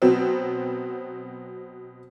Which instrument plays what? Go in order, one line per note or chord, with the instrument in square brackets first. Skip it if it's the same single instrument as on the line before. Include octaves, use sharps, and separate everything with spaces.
[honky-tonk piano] B2 F#3 B3 C4